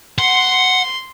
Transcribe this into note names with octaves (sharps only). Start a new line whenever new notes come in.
F#5 C6